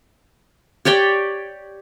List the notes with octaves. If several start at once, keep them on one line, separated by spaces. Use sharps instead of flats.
G4 C#5 D5 G5